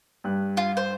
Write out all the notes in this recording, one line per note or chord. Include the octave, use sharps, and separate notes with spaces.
G2 F#6
F4
C5